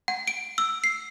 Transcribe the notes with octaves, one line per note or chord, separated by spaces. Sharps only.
F#5
D7
E6
C7